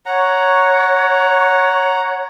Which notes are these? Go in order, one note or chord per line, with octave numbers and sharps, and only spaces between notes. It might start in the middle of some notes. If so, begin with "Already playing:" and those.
C#5 F#5 A#5